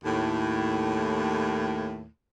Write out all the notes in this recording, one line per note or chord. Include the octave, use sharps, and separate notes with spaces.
D#2 A2